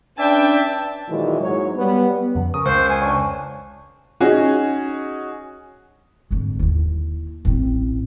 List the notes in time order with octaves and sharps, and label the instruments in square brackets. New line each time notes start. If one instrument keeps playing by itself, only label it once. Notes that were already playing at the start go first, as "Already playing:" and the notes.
[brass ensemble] C#4 D4 B4 [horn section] D5 E5 G5 [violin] A5
[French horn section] A#2 D#3 E3 F#3 G#3
G#2 F#3 C#5
G3 B3
[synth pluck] F2 C#3 [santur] F#5
[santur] C#4 A#4 [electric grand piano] D#6
[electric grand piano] C#2 [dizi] C5
[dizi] G#5
[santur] D4 G5 C#6 [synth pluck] C#5
[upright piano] C#4 D#4 F#4 G#4
[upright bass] G#1 D3
D#2 E4
A1 C4